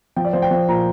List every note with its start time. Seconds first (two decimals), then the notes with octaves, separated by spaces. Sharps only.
0.16 F3 G5
0.25 D5
0.33 F3 C5
0.42 G5
0.51 F3
0.68 A#2 A#5